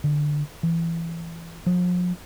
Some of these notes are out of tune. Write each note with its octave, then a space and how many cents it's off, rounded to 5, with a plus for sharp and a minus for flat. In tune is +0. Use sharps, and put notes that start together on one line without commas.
D3 +10
E3 +20
F3 +40